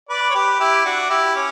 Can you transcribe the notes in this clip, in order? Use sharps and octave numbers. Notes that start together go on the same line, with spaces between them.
B4 D5
C#5
G4 B4
E4 G4
D4 F#4
E4 G4
C#4